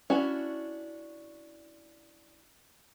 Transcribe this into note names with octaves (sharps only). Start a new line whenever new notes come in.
C#4 D4 E4 F#4